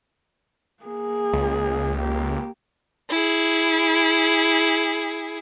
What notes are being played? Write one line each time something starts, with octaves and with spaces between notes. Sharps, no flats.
A#3 G#4
C#2
A#3 G4
E4 G#4